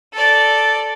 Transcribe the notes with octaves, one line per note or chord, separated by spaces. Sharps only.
A4 D5